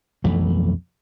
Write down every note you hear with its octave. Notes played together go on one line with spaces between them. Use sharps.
B1 F2 E3 A3